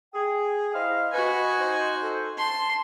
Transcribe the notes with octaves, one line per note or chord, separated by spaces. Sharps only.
G#4 G5
E4 C5 D#5 F5
F#4 B4 G#5
D#4 C5
A4
A5 C6